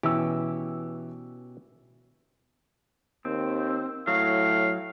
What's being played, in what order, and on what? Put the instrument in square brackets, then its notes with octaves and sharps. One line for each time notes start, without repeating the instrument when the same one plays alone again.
[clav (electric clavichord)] B2 C#4 G4 [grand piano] E3 E6
[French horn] D#2 [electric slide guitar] C4
[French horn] A2 [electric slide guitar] F#3 [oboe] F5